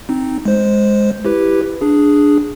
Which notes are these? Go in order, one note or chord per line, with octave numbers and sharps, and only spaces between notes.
C4 D#4
G#3 C5
E4 G4 B4
D4 G#4